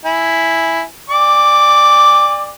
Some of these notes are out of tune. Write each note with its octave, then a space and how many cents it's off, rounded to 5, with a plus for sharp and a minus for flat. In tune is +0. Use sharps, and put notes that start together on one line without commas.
E4 +0 G#5 +0
D5 +15 G5 +45 D6 +0